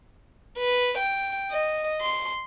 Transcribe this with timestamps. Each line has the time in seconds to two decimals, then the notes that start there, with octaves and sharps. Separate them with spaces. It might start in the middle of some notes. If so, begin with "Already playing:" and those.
0.57 B4
0.98 G5
1.51 D#5
2.01 C6